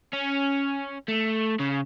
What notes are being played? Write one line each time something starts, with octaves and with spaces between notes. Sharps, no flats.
C#4
A3
C#3